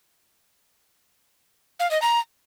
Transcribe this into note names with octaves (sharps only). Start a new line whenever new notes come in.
F5
D#5
A#5